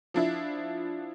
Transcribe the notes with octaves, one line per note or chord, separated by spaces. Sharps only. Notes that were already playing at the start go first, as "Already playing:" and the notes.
F3 D4 E4